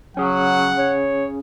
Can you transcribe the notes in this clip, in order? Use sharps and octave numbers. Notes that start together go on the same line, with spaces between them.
F#3 C#4 G#4 F#5
C#5